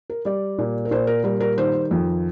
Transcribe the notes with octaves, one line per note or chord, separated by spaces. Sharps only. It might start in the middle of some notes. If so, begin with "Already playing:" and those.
A#4
G3 D5
A#2
A#4
A#2 C5
A#4
G3 A#4
A#4
D#3 C5
F2